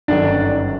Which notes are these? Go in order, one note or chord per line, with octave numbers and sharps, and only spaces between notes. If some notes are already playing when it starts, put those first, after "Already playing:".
G1 F#2 D#3 F#3 D4 D5